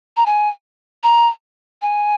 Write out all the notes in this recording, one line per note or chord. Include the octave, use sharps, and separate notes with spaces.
A#5
G#5
A#5
G#5